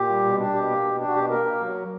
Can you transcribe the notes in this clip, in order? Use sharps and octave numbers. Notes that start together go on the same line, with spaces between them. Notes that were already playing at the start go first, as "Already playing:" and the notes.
Already playing: A#2 G4
G3
B2
D4
B2 G4
A#3
B2
D4
F#4
B2 G4
A#3 A#4
A#3
F#3